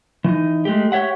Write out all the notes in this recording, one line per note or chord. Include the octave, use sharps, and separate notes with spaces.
E3 D#4
G#3 A3 G4
G4 C#5 E5 F#5